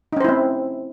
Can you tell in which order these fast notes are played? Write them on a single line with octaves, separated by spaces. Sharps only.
D#4 C#4 C5 E4 C4